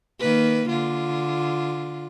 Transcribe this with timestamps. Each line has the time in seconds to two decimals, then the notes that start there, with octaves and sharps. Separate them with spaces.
0.20 D#3 A#3 B4
0.69 D3 F4